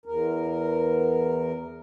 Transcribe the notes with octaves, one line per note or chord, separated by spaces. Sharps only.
E2 A#4